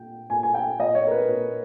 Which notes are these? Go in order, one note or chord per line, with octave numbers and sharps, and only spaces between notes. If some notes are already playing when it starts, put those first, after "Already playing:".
Already playing: A#2 G5
A#2 G#5
G#5
G5
A#2 D#5
C#5
A#4
B4
A#2